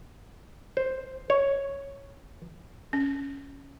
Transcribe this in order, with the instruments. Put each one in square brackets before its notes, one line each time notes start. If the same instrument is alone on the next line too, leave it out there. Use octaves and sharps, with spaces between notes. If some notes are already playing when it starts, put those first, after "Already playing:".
[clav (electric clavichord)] C5
C#5
[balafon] C#4